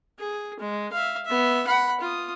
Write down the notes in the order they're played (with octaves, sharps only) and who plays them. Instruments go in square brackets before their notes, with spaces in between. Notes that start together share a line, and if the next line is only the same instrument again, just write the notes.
[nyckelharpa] G#4
G#3
E5 F5
B3 E5
F#5 B5
F4 D#6